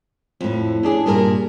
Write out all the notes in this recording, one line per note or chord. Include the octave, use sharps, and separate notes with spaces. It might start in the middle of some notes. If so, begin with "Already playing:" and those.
F2 A2
C#4 D4 G#4
G2 A#2 G#4 A#4